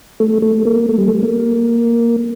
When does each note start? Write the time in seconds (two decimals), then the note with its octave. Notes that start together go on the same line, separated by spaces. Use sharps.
0.20 A3
0.42 A3
0.65 A#3
0.89 A3
0.98 G3
1.08 A3
1.23 A#3